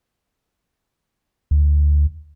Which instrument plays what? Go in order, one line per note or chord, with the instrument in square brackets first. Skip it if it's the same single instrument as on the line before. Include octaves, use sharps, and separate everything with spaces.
[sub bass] D2